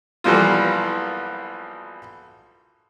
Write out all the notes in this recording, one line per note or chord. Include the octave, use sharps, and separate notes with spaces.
B1 E3 F3 G3 A#3 F4